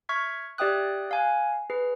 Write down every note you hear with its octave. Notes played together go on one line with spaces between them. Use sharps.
E5 C#6 F6 G#6 B6
G4 D5 E5 G5 D#6 F#6
F5 G#5 F#6
G#4 B4 C7